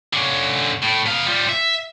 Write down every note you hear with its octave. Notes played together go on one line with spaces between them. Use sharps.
D3 C#4
A2
B3 F5
G3 F4
E5